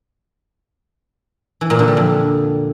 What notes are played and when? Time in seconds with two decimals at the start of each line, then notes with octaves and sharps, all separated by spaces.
1.61 E3
1.70 A#2
1.79 D3
1.88 G3
1.97 F2